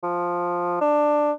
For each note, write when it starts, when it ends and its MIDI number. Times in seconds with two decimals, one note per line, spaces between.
0.03 0.78 53
0.81 1.32 62